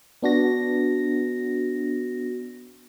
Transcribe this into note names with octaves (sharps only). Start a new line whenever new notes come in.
B3 D4 F#4 A#6